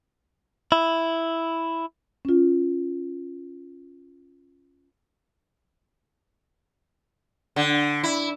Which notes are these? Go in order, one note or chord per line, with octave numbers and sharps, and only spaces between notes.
E4
C#4 F4
D3
E4